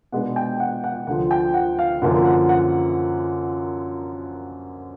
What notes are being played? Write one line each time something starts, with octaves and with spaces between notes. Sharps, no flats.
B2 G#3 B3 D4 F#5
G5
F#5
F#5
D2 D3 F3 F#5
G5
F#5
F5
F#2 D3 F3 A#3 F#5
F#5
F#5